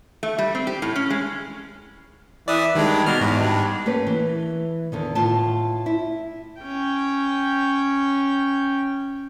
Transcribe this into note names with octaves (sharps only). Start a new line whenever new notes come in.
A3
G3
C4
G4
A2
C#4
G#3
E3 D5 D#6
G2 D#3 G#3
B2 F6
E2 G#2
G2
A3 A#3 C#4 B4
E3
E2 D3 D#3
A2 F4 A5
E4
C#4 G5